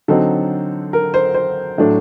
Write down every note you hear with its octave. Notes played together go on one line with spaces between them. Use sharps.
D3 F#3 C4 D#4 A4
A#4
C5
C5
A2 F#3 A3 D4